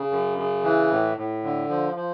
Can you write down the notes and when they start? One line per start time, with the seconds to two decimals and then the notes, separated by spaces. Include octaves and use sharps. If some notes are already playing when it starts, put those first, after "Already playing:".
Already playing: C#3
0.11 F#2
0.38 C#3
0.64 E3
0.91 A2
1.18 A2
1.44 D3
1.69 F3
1.96 F3